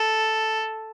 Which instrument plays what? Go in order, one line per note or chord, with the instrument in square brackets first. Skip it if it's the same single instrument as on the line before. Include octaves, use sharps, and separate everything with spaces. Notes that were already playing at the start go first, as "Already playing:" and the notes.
Already playing: [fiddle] A4